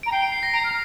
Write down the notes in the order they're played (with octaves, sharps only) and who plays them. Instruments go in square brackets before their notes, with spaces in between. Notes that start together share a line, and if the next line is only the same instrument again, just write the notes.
[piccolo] A#5 [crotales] D7
[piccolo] G5 [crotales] C7
[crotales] D7
C7
A#6
[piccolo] A#5 [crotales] D7
[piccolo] F6